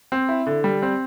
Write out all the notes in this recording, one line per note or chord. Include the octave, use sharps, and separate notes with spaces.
C4
E4
D3
G3
C4